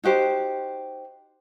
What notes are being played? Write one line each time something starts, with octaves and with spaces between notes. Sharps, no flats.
D#4 F#4 G4 C5